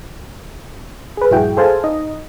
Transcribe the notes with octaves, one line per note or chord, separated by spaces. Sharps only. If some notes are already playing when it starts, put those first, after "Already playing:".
G#4 B4
A#1 G2 E4 F#4 G#4 G5
G#4 A4 C5 F5 G#5 A5
D#4 D#5